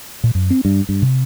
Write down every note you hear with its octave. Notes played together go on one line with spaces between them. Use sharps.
A#2
F#2
C4
G2
G2
C3